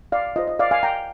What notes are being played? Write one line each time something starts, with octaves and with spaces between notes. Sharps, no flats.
D5 F5
F4 C5 D#5
D#5
D5 F5
F5 G#5
G5 A#5